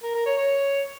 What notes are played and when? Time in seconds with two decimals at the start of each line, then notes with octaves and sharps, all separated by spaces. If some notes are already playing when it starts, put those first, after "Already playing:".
0.03 A#4
0.14 A#4
0.26 C#5
0.37 C#5